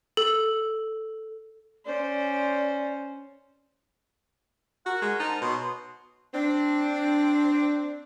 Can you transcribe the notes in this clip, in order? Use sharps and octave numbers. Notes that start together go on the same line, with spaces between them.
A4
C#4 C5 D5
F#4 A#4 F#5
G#3
D#4 A#4 C5 A5
B2 C#5 D#5 C6
C4 D4